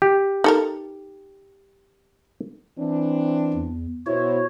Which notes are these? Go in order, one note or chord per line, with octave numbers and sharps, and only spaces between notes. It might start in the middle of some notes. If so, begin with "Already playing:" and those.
G4
D#4 A4 A#4
E3 C4 D4
E2
B2 E4 F#4 C5 C#5